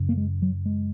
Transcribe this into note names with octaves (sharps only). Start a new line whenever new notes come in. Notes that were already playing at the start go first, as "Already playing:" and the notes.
Already playing: F#2 C#3
A#3
G#3
F#3
G#3